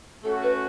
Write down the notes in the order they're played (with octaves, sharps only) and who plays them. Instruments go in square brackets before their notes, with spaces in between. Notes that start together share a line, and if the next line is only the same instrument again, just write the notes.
[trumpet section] A3 C#4 F#4 [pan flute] A4
[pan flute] B4